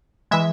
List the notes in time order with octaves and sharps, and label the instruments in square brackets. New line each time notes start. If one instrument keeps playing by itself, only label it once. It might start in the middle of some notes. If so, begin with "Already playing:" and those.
[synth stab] E3 G#3 E5